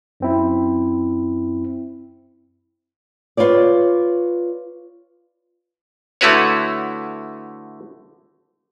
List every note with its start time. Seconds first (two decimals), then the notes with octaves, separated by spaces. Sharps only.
0.20 F#2 C4 E4
3.37 F4 B4 C#5 D5
6.21 D3 A3 E4 F#4 B4 C#5